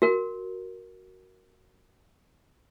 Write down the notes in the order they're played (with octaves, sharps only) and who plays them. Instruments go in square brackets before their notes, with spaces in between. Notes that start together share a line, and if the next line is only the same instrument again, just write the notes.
[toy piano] F#4 A#4